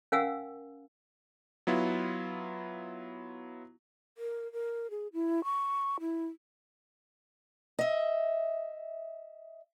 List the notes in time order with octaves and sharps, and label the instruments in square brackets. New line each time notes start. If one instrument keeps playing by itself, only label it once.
[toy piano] C#4 A#4 F5 F#5 G#5 E6
[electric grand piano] F#3 B3 E4 F4
[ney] A#4
A#4
G#4
E4
C#6
E4
[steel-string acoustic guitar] D#5 E5